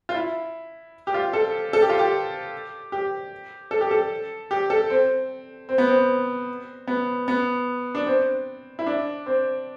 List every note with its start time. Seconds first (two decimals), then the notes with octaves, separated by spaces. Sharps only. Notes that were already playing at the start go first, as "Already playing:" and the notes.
0.09 F4
0.14 E4
1.07 G4
1.14 F4
1.33 A4
1.73 A4
1.82 G4
1.90 F4
1.99 G4
2.92 G4
3.71 A4
3.81 G4
3.91 A4
4.51 G4
4.70 A4
4.90 C4
5.69 C4
5.78 B3
5.87 C4
6.87 B3
7.28 B3
7.95 D4
8.07 C4
8.79 E4
8.87 D4
9.26 C4